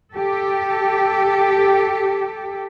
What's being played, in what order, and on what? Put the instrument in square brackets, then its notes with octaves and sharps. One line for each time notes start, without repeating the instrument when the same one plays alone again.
[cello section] G4 A4